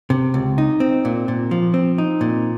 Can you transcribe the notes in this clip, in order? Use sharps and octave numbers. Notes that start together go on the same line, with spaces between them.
C3
C#2
D#4
C4
A#2
A#2
F3
C4
D#4
A#2